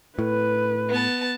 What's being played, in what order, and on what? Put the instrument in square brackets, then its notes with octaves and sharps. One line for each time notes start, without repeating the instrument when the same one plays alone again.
[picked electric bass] A2 [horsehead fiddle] B4
[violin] B3 A5